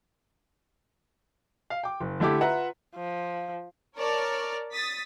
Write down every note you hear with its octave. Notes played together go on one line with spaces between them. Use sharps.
F5
G5 D6
F#1
D3 A3 E4 G4 D6
F4 B4 E5 F#5 A#5
F3
A#4 C#5 D5 A5 D6 F6
D#6 A6 B6